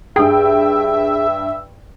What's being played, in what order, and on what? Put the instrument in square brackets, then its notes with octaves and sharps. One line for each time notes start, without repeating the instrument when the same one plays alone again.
[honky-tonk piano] G2 G5 [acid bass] G#4 [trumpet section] E5